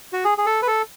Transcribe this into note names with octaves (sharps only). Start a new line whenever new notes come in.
F#4
G#4
G#4
A4
B4
A4